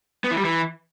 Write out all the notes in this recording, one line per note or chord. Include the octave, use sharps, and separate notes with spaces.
B3
E3
G3
E3